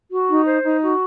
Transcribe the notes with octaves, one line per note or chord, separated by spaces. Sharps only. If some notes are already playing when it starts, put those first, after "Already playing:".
F#4
D#4
C5
D#4
F#4